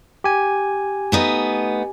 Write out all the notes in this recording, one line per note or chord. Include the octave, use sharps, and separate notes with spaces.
G4 G#5
A3 B3 D#4